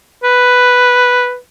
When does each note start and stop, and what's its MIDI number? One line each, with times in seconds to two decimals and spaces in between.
0.24 1.37 71